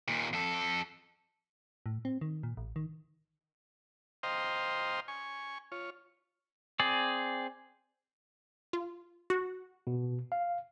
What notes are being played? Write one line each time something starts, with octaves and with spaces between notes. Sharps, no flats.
D#2 A#2
F2 A4
A2
C4
D#3
A#2
A1
D#3
C5 D#5 F5 G5 A#5 C6
G#5 C#6
F4 C#5
C4 G#4 D5
F4
F#4
B2
F5